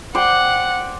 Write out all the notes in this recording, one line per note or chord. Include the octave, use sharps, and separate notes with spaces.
C5 D5 F#5 G5